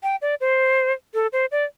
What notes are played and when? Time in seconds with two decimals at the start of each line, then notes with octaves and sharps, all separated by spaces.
0.03 G5
0.22 D5
0.41 C5
1.14 A4
1.33 C5
1.51 D5